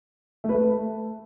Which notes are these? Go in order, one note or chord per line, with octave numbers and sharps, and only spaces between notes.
A3
B4
A3